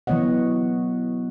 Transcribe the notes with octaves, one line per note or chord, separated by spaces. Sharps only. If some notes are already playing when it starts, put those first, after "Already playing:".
E3 F#3 B3 C#5 D#5 F#5